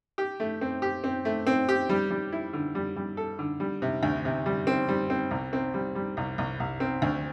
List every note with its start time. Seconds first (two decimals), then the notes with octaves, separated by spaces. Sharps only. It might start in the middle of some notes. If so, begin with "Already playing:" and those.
0.18 G4
0.40 A3
0.61 C4
0.82 G4
1.04 C4
1.25 A3
1.47 C4
1.69 G4
1.89 G3
2.11 G3
2.32 E4
2.53 D3
2.75 G3
2.96 G3
3.17 A4
3.39 D3
3.60 G3
3.82 C3
4.03 D2
4.25 C3
4.46 G3
4.67 C4
4.88 G3
5.10 C4
5.31 C2
5.53 C4
5.74 G3
5.95 G3
6.17 C2
6.38 C2
6.60 C2
6.80 C4
7.02 D2